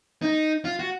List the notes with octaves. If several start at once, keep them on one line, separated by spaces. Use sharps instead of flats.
D#4
F4
F#4